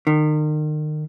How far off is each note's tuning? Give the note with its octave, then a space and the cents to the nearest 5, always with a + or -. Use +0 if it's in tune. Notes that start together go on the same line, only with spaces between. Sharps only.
D#3 -35